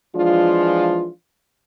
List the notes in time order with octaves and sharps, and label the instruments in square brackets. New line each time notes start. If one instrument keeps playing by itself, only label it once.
[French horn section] E3 F3 G#3 D4 F4